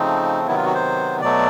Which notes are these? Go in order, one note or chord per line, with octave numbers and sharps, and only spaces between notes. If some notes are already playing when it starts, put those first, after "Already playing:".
Already playing: C#3 F3 A3 C4 D#4
C3 D#3 F#3 B3 E4
F4
F#4
C5
B2 F#3 A3 D5